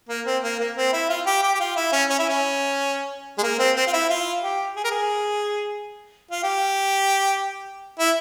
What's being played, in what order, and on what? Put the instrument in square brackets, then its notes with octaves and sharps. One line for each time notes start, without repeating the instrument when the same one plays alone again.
[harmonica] A#3
C4
A#3
A#3
C4
E4
F4
G4
G4
G4
F4
E4
C#4
C#4
E4
C#4
G#3
A#3
C4
C4
F4
E4
F4
G4
G#4
A#4
G#4
F4
G4
E4